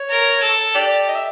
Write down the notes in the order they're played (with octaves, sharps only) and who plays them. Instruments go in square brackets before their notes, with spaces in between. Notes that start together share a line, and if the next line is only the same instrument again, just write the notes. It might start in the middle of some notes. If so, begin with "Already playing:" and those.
Already playing: [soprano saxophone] C#5
[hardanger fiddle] A#4
A4
[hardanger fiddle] G4 [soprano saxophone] D5
[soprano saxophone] D#5
E5